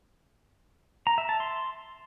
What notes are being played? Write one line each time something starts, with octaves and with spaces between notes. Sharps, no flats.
A#5
E5
A5
C6